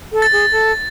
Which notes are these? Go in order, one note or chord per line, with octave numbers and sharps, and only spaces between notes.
A4
A6
G#4
A4